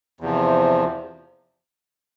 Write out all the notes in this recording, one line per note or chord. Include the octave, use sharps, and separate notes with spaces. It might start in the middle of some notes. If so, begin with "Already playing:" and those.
E2 C3 F3